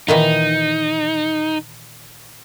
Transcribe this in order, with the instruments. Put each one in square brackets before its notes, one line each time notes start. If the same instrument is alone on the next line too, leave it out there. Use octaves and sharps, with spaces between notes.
[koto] A#2 D#3 E3 [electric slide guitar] D#4